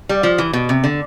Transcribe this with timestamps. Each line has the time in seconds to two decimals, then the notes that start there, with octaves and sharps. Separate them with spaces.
0.09 G3
0.23 F3
0.38 E3
0.53 B2
0.69 C3
0.84 D3